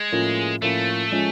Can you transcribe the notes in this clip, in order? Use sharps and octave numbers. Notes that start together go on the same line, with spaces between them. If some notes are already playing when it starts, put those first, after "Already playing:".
Already playing: G#3
A2 F3 A#3 C#4 F4
A2 F3 A3 A#3 C#4 F4
F3 G#3 C#4